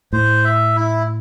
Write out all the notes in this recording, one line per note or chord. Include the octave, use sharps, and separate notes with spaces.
A2 C5
E5
E4